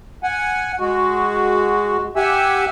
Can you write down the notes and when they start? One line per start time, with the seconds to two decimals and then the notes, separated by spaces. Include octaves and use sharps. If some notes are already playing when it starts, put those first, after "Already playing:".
0.23 F#5 G#5
0.80 G#3 F#4
2.16 G4 E5 F#5 G#5 E6